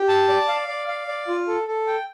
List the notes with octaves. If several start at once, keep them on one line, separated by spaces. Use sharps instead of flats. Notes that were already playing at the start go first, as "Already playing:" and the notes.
Already playing: G4
A5
D5
F5
D5
F5
D5
F4
A4
A4
G5